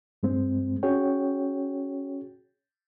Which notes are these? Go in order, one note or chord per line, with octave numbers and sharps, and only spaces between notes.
G2 G#3 C4
C#4 F#4 G#4 C#5 G5